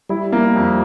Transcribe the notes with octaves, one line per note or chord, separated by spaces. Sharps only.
G3 E4
A#3
F2